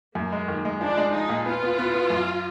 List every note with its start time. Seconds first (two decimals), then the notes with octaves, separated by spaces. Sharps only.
0.15 F#2 A#3
0.32 G#3
0.48 D#3
0.65 G#3
0.80 F3 D4
0.97 G#3
1.13 F3 D#4
1.29 A#2
1.45 B3 F4
1.63 B3
1.78 B3
1.94 B3
2.10 F#2